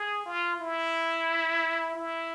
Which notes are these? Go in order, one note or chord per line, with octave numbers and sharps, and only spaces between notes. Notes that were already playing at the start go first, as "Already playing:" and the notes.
Already playing: G#4
F4
E4
E4